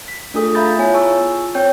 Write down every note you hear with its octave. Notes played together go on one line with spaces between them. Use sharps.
B6
A3 D4 F4 G#4 A4 D#6
E5 F5 A#5 B5 G6 A6
B3 E4 F4 C#5 G#5
F4 G#4 G#5 A5 C#6 E6
C4 C#5 G5 G6